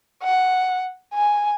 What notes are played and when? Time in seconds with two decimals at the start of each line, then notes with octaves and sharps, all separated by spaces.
0.23 F#5
1.14 G#5